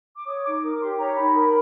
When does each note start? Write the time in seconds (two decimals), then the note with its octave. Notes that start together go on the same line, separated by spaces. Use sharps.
0.16 D6
0.26 C#5 D#6
0.44 D#4 D6
0.63 A#4 D6
0.80 G4 C6
0.98 C#5 A#5
1.16 D#4 B5
1.35 A#4